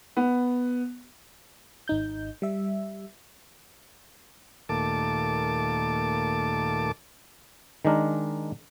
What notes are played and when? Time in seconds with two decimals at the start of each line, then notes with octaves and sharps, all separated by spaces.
0.17 B3
1.88 G#1 D#4 G6
2.42 G3 E5
4.69 D#2 A#2 A3 A5 D6
7.85 D#3 G#3 D4 A#4